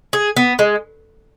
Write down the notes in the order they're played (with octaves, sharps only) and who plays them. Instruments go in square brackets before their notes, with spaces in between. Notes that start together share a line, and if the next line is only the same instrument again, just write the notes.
[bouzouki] G#4
B3
G#3